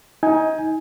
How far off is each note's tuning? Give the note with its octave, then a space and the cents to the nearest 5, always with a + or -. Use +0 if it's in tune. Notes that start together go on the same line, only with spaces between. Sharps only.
D#4 +25 G#5 +0